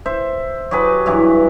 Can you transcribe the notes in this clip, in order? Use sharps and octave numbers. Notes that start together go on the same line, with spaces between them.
C5 E5
F#3 G4 G#4 B4
G2 E3 F#3